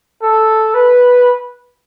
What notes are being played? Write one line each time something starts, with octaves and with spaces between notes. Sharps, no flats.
A4
B4